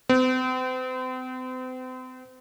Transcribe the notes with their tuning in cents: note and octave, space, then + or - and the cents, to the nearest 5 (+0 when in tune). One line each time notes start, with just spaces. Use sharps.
C4 -40